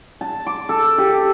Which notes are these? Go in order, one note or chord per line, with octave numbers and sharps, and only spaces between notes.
A5
D6
A4
G4